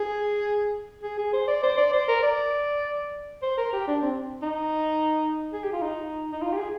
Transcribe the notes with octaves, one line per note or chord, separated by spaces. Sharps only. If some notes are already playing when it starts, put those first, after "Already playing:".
Already playing: G#4
G#4
G#4
C5
D5
C5
D5
C5
A#4
D5
C5
A#4
G4
D4
C4
D#4
G#4
G4
F4
D#4
D#4
F4
G4
G#4